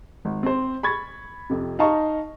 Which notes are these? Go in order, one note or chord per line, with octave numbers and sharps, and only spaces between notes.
G#1
C4 C5
B5 C#6 G#6 A6
F2 C3
D#4 D#5 F5 A5 A#5 C#6